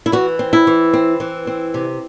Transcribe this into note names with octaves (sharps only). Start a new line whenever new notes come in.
E4
E3 F#4
C4
E4
E3
C4
E3
C4
C3